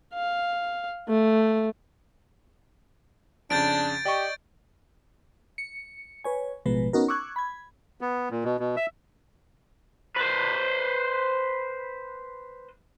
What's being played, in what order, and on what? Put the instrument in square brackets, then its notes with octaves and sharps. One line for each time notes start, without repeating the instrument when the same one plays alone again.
[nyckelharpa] F5
A3
[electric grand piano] F2 C#3 [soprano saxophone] D4 [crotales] G6 A6 D7
[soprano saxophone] G4 [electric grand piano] D5 D#5 C#6
[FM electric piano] C#7
B4 C#5 G#5
A1 B2 F3 G#3 B4
B3 C#4 D#4 F#4 A#4
C#6 D6 E6 F#6 G#6
B5 G#6
[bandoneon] B3
A#2
B2
B2
E5
[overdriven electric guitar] B4 C5